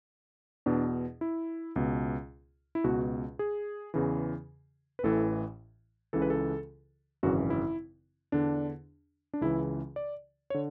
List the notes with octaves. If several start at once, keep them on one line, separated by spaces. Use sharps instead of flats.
E2 B2 D4
E4
C#2 B2
E4
C#2 B2 F#4
G#4
E2 C#3 E3
B4
A1 A2 E3 A4
C#2 C#3 E3 A4
B4
A4
G#1 F#2 C#3 E3 F#4
E4
E2 D3 D4
D4
C#2 C#3 E3 E4
D5
C#5
D3